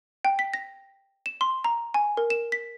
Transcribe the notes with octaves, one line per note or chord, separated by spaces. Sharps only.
G5
B6
A#6
E7
C6
A#5
G#5
A#4
E7
B6